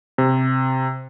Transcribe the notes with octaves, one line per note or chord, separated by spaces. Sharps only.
C3